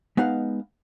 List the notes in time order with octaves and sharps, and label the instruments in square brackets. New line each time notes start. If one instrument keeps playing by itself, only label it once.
[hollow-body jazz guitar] G#3 B3 D#4 F5 F#5